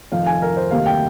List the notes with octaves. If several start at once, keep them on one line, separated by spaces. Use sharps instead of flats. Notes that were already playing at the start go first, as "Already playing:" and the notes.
F1 F2 D#3 F5
G#5
A#4
C5
D2 C3 D#3 G3 A#3 F5
G5